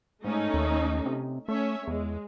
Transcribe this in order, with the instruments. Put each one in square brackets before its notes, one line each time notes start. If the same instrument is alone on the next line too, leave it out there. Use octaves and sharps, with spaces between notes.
[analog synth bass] G#2 [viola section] A3 C#4 D#4
[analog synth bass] D#2
C3
[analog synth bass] A3 [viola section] C#4 C#5 E5
[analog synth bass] E2 [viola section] G#3